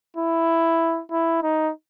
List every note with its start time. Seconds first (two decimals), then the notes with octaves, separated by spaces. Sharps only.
0.17 E4
1.12 E4
1.43 D#4